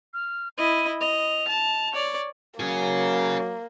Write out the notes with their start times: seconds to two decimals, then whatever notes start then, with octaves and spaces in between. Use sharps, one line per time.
0.14 F6
0.58 E4 D#5 D#7
1.01 D#5 F7
1.48 A5
1.92 C#5 D5
2.60 F#3 A#3 C#4 G#4